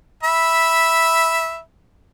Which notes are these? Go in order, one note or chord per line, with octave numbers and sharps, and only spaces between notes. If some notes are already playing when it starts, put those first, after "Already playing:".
E5 B5